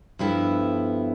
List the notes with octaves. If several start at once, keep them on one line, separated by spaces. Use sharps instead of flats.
G2 F3 B3 E4 A4